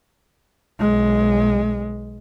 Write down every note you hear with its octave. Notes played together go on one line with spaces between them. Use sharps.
B1 G#3